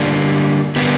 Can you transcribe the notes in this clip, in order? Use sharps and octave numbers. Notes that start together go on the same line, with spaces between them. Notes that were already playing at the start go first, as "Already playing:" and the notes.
Already playing: D3 G3 A#3
D3 G3 A#3 B3